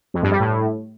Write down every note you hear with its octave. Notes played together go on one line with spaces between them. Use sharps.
F2
G2
G3
A2